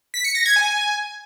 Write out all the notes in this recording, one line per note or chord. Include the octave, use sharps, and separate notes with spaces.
B6
C#7
A#6
G#6
G#5